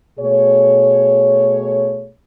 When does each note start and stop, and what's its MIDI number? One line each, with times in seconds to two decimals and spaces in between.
0.19 2.11 47
0.19 2.11 57
0.19 2.11 68
0.19 2.11 73